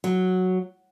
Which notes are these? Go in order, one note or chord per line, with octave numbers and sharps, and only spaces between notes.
F#3